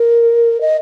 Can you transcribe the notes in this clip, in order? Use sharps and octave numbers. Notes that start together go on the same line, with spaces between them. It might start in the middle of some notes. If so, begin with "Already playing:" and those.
Already playing: A#4
D#5